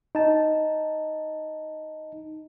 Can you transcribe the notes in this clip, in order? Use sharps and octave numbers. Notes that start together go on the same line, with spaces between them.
D#4 A5